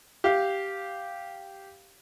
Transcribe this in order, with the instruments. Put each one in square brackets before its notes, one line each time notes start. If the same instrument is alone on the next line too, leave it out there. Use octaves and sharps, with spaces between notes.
[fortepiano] G4 F5